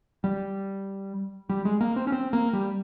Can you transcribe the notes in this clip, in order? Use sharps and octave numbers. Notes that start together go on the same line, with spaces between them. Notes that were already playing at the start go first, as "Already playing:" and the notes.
G3
G3
G#3
A#3
C4
C#4
C4
A#3
G3